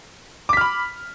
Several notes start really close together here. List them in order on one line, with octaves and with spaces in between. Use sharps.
D6 B6 F6 B5